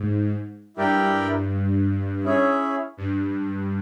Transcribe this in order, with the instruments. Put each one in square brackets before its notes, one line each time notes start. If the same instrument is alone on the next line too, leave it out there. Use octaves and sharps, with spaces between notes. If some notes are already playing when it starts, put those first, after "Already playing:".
Already playing: [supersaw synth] G#2
[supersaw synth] G2 [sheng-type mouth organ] E4 G4 A#4 D5 G5
[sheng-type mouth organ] C#4 E4 G#4 C#5 E5
[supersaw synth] G2